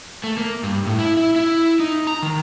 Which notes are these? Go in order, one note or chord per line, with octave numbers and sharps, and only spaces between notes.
A3
A#3
G2
A2
E4
E4
E4
D#4
A#5
D#3